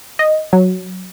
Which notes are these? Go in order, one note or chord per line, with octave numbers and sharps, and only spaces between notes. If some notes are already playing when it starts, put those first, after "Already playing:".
D#5
F#3